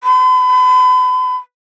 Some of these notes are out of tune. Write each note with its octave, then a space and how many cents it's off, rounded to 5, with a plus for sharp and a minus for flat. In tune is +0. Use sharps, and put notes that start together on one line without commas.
B5 +40